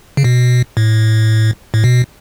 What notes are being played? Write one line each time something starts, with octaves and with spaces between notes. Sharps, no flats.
C#3
B2
A2
A2
B2